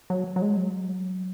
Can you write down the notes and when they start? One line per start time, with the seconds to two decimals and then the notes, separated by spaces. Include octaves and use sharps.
0.10 F#3
0.36 F#3
0.42 G#3
0.57 F#3